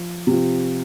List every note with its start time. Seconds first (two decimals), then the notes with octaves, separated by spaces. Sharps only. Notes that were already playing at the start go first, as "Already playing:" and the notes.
Already playing: F3
0.27 C3 F3